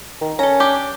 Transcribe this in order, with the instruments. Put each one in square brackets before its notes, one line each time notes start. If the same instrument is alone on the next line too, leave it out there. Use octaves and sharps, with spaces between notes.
[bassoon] D#3
[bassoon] C#4 [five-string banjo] A4 A#5
[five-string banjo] D4 G4